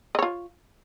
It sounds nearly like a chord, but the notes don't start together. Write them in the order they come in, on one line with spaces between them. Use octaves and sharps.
D#5 C#5 F4